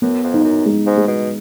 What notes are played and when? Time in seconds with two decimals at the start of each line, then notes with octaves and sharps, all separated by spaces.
0.02 F#2 B3
0.23 F2
0.34 D#4
0.44 F#2
0.66 G#3
0.86 G#2
0.97 G#3
1.08 B2